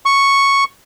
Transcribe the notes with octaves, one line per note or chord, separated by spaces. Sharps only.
C#6